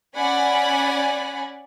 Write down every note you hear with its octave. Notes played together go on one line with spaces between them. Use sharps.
C#4 D5 F#5 G#5 B5